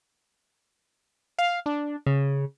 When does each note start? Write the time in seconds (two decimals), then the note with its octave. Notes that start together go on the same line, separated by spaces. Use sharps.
1.39 F5
1.66 D4
2.06 C#3